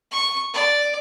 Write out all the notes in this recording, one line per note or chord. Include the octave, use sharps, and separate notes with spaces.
C#6
D5